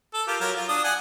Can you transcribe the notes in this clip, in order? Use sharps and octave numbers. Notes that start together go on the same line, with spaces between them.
A4
F4 G4 A#4
F#3 A#4
F4
D4 D#6
F#5 G#5